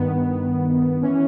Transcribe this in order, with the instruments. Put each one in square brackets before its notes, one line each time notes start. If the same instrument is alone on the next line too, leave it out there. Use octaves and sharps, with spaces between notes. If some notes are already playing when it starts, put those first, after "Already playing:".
Already playing: [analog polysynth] G2 D#3 B3
E3 C#4